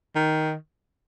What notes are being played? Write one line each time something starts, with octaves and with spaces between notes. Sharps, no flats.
D#3